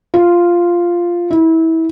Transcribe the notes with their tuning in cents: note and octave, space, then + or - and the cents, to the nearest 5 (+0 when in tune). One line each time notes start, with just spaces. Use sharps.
F4 -5
E4 -25